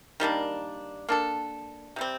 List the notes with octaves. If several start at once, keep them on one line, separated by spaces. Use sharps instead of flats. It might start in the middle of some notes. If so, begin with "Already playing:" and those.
D#3 G3 A#3 D4
A#3 D4 A4
C3 G3 C4